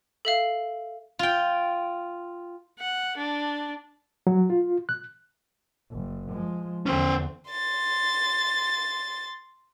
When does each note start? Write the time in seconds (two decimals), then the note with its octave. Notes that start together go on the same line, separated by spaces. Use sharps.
0.25 A4 E5 F5
1.19 F4 G5
2.79 F#5
3.17 D4
4.27 F#3
4.50 F4
4.89 F#6
5.92 F#1
6.30 F3 G#3
6.86 E2 D3 C#4 C5
7.51 C6 A6